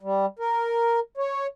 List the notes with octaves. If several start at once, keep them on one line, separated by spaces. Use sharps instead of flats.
G3
A#4
C#5